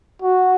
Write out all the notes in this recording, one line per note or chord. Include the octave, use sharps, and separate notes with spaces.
F#4